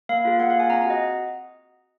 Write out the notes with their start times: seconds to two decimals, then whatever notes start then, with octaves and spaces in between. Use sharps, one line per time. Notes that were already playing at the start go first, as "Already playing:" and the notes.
0.09 A#3 F5
0.25 F4 G#4
0.40 A#3 F#5
0.50 F5
0.55 F4 G#4 G#5
0.70 C4 A#5
0.81 F#5
0.85 F#4 D#5